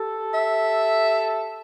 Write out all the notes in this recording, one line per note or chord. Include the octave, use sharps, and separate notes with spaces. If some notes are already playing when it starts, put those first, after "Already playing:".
Already playing: G4 A4
E5